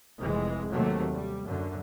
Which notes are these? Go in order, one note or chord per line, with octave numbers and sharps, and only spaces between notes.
F1 E3 G#3
D#2 C3 F#3 A3
G3
F#2 D3